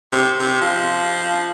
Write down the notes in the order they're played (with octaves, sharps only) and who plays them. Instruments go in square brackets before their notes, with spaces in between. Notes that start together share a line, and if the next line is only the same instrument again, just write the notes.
[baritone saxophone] C3
C3
F3